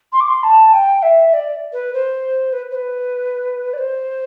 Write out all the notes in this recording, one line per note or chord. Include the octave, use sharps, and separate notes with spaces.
C6
D6
C6
A5
G5
E5
D5
B4
C5
B4
C5
B4
D5
C5